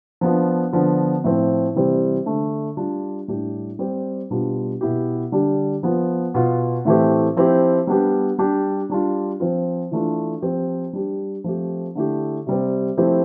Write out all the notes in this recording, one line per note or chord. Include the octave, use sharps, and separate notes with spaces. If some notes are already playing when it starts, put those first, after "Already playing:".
F3 B3 D4 F4
D3 F3 B3 F4
A2 F3 C4
C3 E3 G3 C4
D3 A3 D4
G3 D4 F4
A2 G3 D4 G4
G3 C4 G4
B2 G3 D4 F4
B2 B3 E4 G4
D3 G3 D4 G4
F3 B3 F4
B2 B3 F4
A2 E3 A3 C4 G4
F3 C4 E4 G4
G3 B3 D4 G4
G3 D4 G4
G3 D4 F4
F3 C4 F4
E3 A3 D4 F4
F3 C4 G4
G3 D4 G4
F3 A3 C4 G4
D3 A3 E4 G4
C3 G3 C4
F3 A3 C4 E4 G4